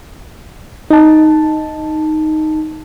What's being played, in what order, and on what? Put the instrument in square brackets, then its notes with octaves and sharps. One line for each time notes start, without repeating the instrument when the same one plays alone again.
[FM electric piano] D#4 A5